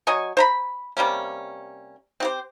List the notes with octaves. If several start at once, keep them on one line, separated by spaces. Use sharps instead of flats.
F#3 D#5 G#5 C#6
C5 A#5 B5
C3 G3 A#3 C#4
C4 G4 C5